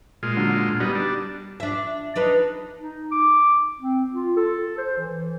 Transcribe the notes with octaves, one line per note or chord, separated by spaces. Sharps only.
A#2 G#3 F4
D3 F#3
G3 B3 D#4
D4
D4 E5
D4 D#4 B4
D#4
D6
C4
F4
A4
C5
E3